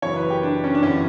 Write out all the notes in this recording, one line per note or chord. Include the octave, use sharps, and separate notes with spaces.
F#1 F#2 E3 C#5
B4
G4
D4
C#4
D4
G1 F#2 E3 G3 C#4